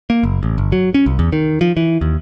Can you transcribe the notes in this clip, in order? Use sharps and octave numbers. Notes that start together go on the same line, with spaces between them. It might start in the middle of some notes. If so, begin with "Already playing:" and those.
A#3
F#1
A1
G1
F#3
C#4
C2
E2
D#3
F3
E3
D#2